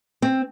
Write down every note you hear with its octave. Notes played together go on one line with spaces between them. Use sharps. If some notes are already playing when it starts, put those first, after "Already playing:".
C4